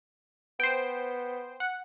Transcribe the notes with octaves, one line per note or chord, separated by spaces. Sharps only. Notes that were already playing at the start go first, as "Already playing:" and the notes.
B3 C5 G5
F#5